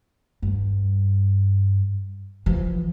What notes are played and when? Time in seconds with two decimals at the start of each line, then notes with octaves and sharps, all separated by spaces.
0.43 G2
2.46 E3 F3